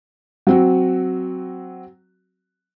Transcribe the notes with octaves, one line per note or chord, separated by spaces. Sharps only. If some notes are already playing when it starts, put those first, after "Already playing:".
F#3 C4 F#4